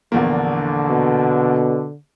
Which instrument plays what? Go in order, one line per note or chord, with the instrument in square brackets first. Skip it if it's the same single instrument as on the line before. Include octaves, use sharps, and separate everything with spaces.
[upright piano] A#1 E2 A#3 [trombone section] D3
[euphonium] B2